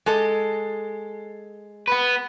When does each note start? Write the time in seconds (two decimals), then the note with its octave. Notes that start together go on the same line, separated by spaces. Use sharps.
0.06 G#3 A4 D#5
1.88 B3 B4